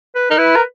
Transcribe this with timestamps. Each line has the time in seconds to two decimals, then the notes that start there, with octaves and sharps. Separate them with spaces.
0.16 B4
0.30 D#4 A#4
0.38 E4 B4
0.56 A#4